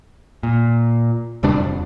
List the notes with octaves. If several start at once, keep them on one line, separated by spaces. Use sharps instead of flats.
A#2
D1 C3 G3 D4
F2